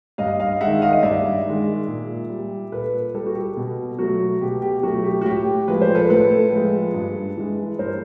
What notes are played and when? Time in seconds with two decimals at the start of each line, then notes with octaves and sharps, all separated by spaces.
0.18 G2 D#5 F5
0.39 D#5 F5
0.61 D#3 G#3 E5 F#5
0.82 D#5 F5
0.93 D#5
1.03 G2 D5 E5
1.45 D#3 G#3
1.87 A#2
2.29 G3
2.72 A#2 A4 B4
3.15 G3 G4 A4
3.26 F#4
3.36 G4
3.57 B2
3.99 F#3 A3 F#4
4.41 B2 G4
4.62 G4
4.83 F#3 A3 F#4
5.04 G4
5.21 F#4
5.25 A2 G4
5.68 F3 G#3 B4
5.81 C5
5.95 A4 B4
6.10 A2 A4 B4
6.52 F3 G#3
6.94 G2
7.37 E3 G#3
7.79 G2 A#4 C5